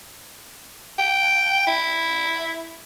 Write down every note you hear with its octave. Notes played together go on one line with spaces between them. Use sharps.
G5
E4